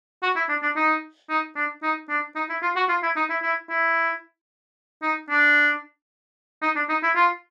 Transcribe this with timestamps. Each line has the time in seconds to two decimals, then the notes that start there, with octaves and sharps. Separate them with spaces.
0.22 F#4
0.36 E4
0.48 D4
0.62 D4
0.76 D#4
1.29 D#4
1.55 D4
1.83 D#4
2.09 D4
2.36 D#4
2.49 E4
2.62 F4
2.76 F#4
2.89 F4
3.03 E4
3.16 D#4
3.30 E4
3.42 E4
3.69 E4
5.02 D#4
5.30 D4
6.62 D#4
6.76 D4
6.89 D#4
7.03 E4
7.16 F4